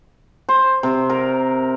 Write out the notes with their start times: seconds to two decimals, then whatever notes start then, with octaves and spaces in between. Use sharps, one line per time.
0.49 C5
0.83 C3
1.10 A#4